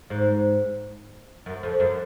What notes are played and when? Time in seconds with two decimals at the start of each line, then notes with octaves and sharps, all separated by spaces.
0.10 G#2
1.46 F#2
1.63 F2
1.80 F#2